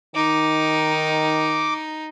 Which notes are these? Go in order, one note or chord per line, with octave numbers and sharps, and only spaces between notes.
D#3 D#4 D6